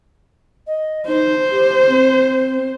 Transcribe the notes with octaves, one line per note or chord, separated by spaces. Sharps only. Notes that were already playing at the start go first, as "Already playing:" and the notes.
D#5
D#4 C5
G4
C4